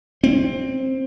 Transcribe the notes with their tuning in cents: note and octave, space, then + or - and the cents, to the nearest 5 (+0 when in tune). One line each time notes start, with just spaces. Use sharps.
C4 +10